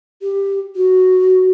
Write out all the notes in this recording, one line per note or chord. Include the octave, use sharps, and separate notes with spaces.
G4
F#4